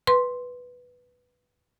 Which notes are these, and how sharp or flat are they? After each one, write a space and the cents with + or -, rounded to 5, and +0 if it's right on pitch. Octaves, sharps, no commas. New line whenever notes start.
B4 +0 C6 +0